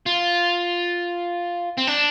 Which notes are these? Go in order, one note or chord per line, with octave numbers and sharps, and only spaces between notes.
F4
C4
D4